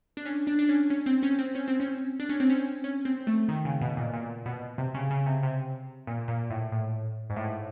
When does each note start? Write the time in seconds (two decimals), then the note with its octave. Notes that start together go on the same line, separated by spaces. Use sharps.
0.17 D4
0.25 C#4
0.47 D4
0.59 D4
0.69 C#4
0.90 C#4
1.06 C4
1.23 C#4
1.39 C4
1.55 C#4
1.68 C4
1.80 C#4
2.20 D4
2.29 C#4
2.40 C4
2.50 C#4
2.84 C#4
3.05 C4
3.27 A3
3.48 D#3
3.65 C#3
3.81 B2
3.97 A#2
4.13 A#2
4.46 B2
4.78 C3
4.95 C#3
5.10 C#3
5.26 C3
5.43 C3
6.07 A#2
6.28 A#2
6.50 A2
6.72 A2
7.30 G#2
7.36 A2